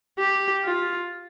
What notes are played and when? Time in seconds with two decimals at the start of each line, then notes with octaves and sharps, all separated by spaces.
0.19 G4
0.64 F4